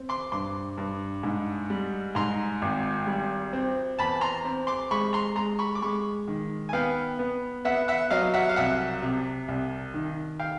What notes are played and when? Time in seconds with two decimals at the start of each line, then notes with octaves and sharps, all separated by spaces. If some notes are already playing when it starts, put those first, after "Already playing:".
Already playing: C4
0.09 C6 D6
0.32 G2 C6 D6
0.78 G2
1.23 G#2
1.70 G3
2.15 G#2 A#5 C6
2.62 G#1
3.07 G3
3.53 C4
3.99 E2 A5 B5
4.21 A#5 C6
4.45 C4
4.67 C6 D6
4.91 G#3 B5 C#6
5.13 A#5 C6
5.36 G#3 A#5 C6
5.59 B5 C#6
5.75 D6
5.82 G#3 B5 C#6
6.28 D#3
6.69 G#5
6.73 B3 F5 G5
7.19 B3
7.65 B3 E5 F#5
7.88 E5 F#5
8.11 F#3 D#5 F5
8.34 E5 F#5
8.49 F5
8.56 C2 E5 F#5
9.02 C3
9.48 C2
9.94 D#3
10.40 F5 G5